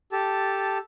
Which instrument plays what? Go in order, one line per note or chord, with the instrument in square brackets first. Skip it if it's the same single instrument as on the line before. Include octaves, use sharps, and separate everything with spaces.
[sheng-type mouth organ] G4 A4 A5